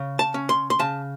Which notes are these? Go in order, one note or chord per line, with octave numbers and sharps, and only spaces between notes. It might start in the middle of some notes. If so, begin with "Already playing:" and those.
Already playing: C#3
A5
C#4
C6
C6
C#3 A5